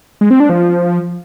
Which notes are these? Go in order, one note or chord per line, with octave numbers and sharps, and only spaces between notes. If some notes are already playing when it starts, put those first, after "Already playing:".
G#3
C4
D4
F3